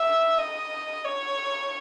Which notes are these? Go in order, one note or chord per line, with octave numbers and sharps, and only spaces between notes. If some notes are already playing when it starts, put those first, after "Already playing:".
Already playing: E5
D#5
C#5